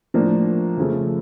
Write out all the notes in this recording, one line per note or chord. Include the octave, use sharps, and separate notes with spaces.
A2 F3 A#3 D4
F2 C#3 F3 A3